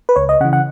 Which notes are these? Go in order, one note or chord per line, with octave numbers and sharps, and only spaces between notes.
B4
C#2 C#5
D#5
C#3 E3 F#5
F#5